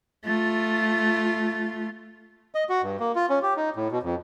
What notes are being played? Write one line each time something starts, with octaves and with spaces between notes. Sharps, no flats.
A3 F4
D#5
F#4
G2
A#3
F4
C#4
G4
D#4
A2
B2
F2